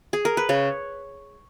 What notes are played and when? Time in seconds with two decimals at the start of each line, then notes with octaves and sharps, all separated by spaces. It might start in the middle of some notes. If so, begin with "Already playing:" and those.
0.13 G#4
0.25 A#4
0.37 B4
0.49 C#3 C#5